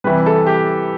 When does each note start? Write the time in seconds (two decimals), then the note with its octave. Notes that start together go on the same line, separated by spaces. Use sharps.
0.04 C3 E3 G3 B4
0.26 A4
0.47 G4